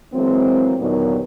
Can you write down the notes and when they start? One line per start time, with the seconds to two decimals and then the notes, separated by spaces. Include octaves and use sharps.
0.14 E3 F#3 G#3 A#3 C4
0.79 D#2 A#2 D3 D#3 F#3 B3